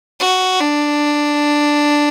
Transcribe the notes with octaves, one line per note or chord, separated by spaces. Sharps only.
F#4
D4